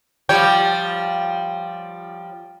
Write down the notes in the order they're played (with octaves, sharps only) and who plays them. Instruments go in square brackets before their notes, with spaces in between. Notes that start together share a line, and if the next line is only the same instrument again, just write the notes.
[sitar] F3 G3 C#5 [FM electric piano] G5